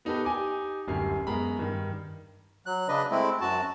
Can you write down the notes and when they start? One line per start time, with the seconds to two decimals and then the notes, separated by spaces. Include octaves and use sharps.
0.05 B3 D#4 G4 A4 B4
0.25 D#4 G4 G#5 D6
0.87 D1 F#2 D3 G3 C7
1.27 F#2 G#3 B3 A#5 B5
1.59 G2 D#3
2.66 F#3 F#6
2.88 C#3 D4 B4 D#5
3.11 G#3 A3 C4 E4
3.41 F#2 F#4 A5